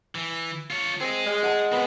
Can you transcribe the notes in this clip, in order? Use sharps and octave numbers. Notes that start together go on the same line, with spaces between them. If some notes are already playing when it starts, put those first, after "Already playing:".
E3
F4 C#5
C4 G#4 D#5
G#3
F#5 A5
B3 C4 B4 G#5